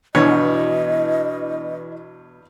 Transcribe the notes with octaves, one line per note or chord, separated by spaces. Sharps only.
E2 G2 B2 E3 D4 C#5 D#5